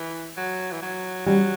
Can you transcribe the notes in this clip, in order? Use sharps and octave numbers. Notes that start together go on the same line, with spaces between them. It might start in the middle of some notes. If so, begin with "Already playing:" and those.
Already playing: E3
F#3
E3
F#3
F#3 G3